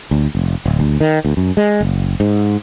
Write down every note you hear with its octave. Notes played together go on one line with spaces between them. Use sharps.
D2
F1
D1
D2
D#3
D2
F#2
G#3
F#1
G#2